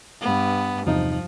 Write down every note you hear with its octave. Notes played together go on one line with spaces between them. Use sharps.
G2 B3
E2 C3 F3 D#4